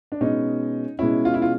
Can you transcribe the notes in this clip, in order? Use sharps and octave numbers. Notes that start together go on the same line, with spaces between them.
D4
B2 G#3 C#4 D#4
B2 G#3 C#4 E4
F4
E4
F4